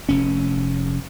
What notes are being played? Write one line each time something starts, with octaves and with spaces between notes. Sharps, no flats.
F1 C#4